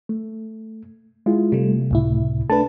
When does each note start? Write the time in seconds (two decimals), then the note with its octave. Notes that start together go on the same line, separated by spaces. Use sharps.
0.09 A3
1.26 G#3 E4 F4
1.52 C3 G3 A3
1.91 C#2 A2 E4
2.50 A3 D4 B4 A5